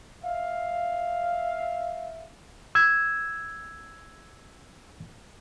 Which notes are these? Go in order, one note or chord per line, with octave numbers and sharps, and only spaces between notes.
E5 F5
E6 G#6